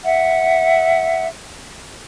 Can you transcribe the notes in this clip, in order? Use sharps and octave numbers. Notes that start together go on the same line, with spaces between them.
E5 F#5